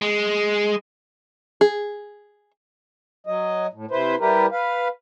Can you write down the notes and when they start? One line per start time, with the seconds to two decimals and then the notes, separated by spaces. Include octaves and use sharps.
0.02 G#3
1.61 G#4
3.27 F#3 D#5
3.73 A2
3.91 C3 E4 B4 C5
4.20 G3 E4 G4 A#4 B4
4.52 B4 F5